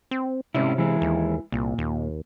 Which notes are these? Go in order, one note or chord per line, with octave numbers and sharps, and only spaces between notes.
C4
G#2 C3 C#4 E4
E3 G#3 E4
D#2
C2 A#2
D#2